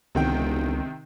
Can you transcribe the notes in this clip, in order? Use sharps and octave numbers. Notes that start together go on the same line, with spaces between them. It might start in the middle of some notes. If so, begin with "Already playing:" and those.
E1 C#2 C3 D#3 G5